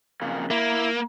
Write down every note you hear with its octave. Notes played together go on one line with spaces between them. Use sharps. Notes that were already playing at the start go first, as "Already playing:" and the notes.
F2 C#3 A#3
A#3 E4 E5